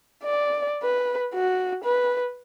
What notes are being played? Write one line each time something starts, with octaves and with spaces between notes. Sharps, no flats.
D5
B4
F#4
B4